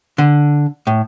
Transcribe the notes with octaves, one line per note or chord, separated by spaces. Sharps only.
D3
A2